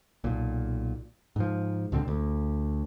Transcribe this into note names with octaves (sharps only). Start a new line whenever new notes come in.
B1 A#2
G#2 F3
C#2 B2 D3 C4
D2